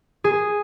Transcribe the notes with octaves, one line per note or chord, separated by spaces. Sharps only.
G#4